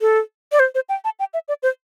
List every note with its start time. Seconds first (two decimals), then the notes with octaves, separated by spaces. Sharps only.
0.01 A4
0.52 D5
0.59 C5
0.75 C5
0.89 G5
1.05 A5
1.19 G5
1.34 E5
1.48 D5
1.63 C5